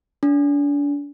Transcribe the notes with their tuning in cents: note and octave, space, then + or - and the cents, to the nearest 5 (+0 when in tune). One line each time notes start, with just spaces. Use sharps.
D4 -35